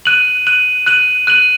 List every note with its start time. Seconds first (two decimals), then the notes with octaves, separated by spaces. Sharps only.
0.05 F#6 D#7 F#7
0.47 F#6 D#7 F#7
0.86 F#6 D#7 F#7
1.27 F#6 D#7 F#7